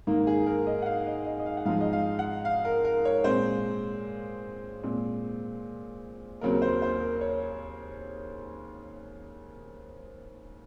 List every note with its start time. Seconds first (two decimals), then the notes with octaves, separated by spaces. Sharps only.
0.07 G#2 D#3 A#3
0.27 G#4
0.46 A#4
0.67 D#5
0.82 F#5
0.86 F5
1.07 D#5
1.26 D#5
1.39 D#5
1.46 F5
1.57 F#5
1.65 G#2 F3 G#3 F5
1.81 D#5
1.93 F5
2.19 F#5
2.45 F5
2.65 A#4
2.85 A#4
3.05 C#5
3.24 A#2 G#3 C4 C5
4.84 A#2 G#3 C4
6.41 D#2 C#3 F#3 C4 A#4
6.62 C5
6.82 C5
7.01 A#4
7.21 C#5